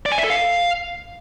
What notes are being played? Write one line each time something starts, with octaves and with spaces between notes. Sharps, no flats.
D5
G#5
E5
A4
F5